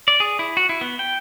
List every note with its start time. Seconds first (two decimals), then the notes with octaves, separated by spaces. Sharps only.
0.08 D5
0.20 G#4
0.39 E4
0.57 F#4
0.69 E4
0.81 B3
0.99 G5